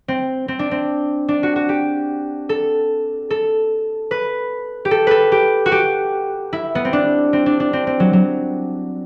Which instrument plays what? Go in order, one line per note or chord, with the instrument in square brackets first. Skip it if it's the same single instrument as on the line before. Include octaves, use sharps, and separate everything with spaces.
[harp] C4
C4
D4
C4
D4
F#4
F#4
G4
A4
A4
B4
G4
A4
A4 B4
G4
F#4
G4
E4
B3
C4
D4
C4
D4
D4
C4
C4
F#3
F#3